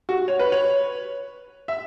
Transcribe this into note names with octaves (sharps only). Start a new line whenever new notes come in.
F#4
C#5
B4
C#5
E5